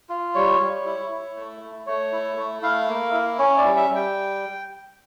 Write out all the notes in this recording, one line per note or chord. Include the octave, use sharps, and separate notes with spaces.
F4
G3 C#5
G3
E4
E4
A3
A3
A3 C#5
E4
A3
E4 F5
A#3
E4
C#4 C#5
D5
G3
E5
G3
G5